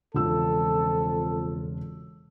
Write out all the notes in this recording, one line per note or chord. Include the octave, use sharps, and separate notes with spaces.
E1 F2 C#3 F4 A4 E6